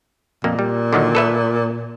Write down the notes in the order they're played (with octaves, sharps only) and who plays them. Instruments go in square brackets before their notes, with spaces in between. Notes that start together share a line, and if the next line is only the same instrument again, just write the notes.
[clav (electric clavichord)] F2 A#3 [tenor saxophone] A#2
[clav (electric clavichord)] G3
D3 D#3 F#3
A4 B4 E5